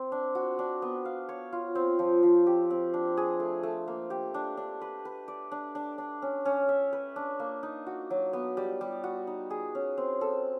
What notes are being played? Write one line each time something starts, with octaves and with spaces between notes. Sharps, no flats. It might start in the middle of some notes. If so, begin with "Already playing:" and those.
Already playing: C4
D4
F#4
D4
B3
F5
C#5
F4
C4
F3
F3
G4
C4
D4
G#4
A3
A3
A#3
G4
D4
D4
B4
B4
D5
D4
D4
D4
C#4
C#4
E5
B4
D4
A#3
D#4
F#4
F#3
B3
G3
G3
F#4
D#4
G#4
C#4
C4
A4